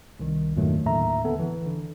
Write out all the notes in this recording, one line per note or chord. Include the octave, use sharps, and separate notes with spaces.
C2 D#3
E2 G2 A#2 D#3 F#3 A3
D#2 A2 D3 E5 A#5
D#2 B3 A4
E3
D3